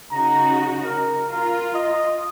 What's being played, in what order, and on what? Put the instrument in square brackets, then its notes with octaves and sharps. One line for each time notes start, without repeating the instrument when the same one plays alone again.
[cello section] C#3 D#4 F#4 [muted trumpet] A#5
[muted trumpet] A#4
[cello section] F4 [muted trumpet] A#4
[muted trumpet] D#5